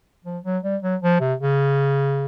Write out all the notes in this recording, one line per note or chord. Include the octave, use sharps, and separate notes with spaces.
F3
F#3
G3
F#3
F3
C3
C#3